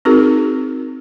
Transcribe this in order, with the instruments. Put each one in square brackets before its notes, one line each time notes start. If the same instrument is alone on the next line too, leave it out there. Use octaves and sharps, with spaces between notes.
[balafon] C4 D#4 F#4 G#4 A#4